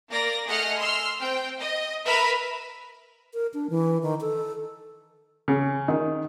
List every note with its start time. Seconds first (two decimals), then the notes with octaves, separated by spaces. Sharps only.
0.10 A#3 A#4 D5 A#6
0.46 A3 G#4 D#5 F#5 F6
0.79 C6 E6 F6
1.20 C4 G5
1.59 D#5
2.06 A#4 B4 E5 B5 E6 F6
3.34 A#4
3.54 D4
3.70 E3
4.03 D#3
4.21 A4
5.48 C#3
5.88 D#3